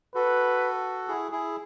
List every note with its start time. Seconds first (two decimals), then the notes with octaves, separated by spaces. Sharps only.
0.15 F#4 A4 B4
1.08 E4 G#4
1.32 E4 G#4